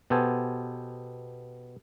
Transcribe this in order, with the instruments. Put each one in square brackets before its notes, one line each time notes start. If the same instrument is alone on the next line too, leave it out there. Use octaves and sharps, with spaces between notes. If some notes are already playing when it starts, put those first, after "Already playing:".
[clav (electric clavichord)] B2 B3 G4 A4 C5 G#5